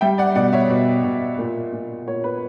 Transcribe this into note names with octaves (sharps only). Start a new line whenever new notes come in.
G3 E5 G5
D5 F#5
B2 D5 F#5
C#5 E5
B2
B2
A#2
A#2
A#2 C#5
B4